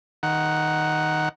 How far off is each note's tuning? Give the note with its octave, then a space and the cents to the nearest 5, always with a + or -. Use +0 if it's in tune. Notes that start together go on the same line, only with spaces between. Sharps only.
D#3 +0 F#5 +5